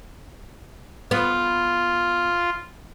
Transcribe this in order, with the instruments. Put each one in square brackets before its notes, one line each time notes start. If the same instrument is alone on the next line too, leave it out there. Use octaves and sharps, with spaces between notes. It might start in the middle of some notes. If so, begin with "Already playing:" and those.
[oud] B3 [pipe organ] F4